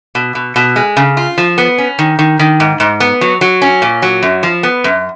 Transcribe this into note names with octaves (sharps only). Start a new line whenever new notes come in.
B2
B2
B2
G#3
C#3
F4
F3
B3
C#4
D#3
D#3
D#3
G#2
G#2
B3
F#3
F#3
C#4
A#2
F#3
F#2
F3
B3
F#2